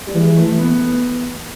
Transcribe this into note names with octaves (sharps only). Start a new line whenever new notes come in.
G3
E3 G#3
A3
B3